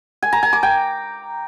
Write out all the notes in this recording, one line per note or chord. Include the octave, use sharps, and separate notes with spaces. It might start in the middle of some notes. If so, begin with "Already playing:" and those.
G#5
A#5
G#5
D6
G5